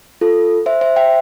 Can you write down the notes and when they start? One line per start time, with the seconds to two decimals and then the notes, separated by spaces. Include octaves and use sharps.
0.21 F4 A4
0.66 C5 E5
0.81 C5 E5
0.96 E5 G5